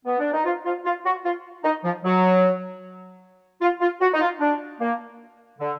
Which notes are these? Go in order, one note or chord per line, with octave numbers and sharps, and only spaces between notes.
B3
D4
D#4
F4
F4
F4
F#4
F4
D#4
F3
F#3
F4
F4
F#4
D#4
F4
D4
A#3
D3